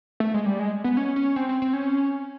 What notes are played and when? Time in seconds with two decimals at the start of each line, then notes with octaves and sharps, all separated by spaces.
0.20 A3
0.34 G#3
0.46 G3
0.59 G#3
0.84 B3
0.97 C#4
1.16 C#4
1.36 C4
1.49 C4
1.62 C4
1.73 C#4